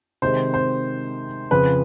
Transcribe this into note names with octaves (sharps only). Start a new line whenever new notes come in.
C3 D#3 G#3 C5
C5
F2 C#3 F3 B4